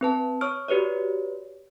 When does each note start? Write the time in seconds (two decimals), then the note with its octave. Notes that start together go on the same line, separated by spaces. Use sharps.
0.01 C4 B4 A5
0.41 C#5 C#6 D#6 F6 D7
0.68 F#4 G4 B4 C#5 D5